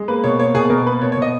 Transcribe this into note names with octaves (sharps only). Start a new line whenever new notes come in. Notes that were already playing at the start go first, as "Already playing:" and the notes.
Already playing: G#3
A#3 B4
B2 C#5
A#3 C#5
B2 G#4
B2 A#4
A#3 B4
B2 C#5
C#5
B2 D#5